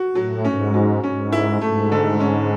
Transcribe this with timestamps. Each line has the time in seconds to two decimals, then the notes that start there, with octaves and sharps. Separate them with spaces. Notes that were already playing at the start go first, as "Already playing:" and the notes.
Already playing: F#4
0.15 A2 F#3
0.44 G#2 C#4
0.74 F#3
1.03 G#2 C#4
1.32 E4
1.61 G#2 A3
1.92 D3
2.20 C#4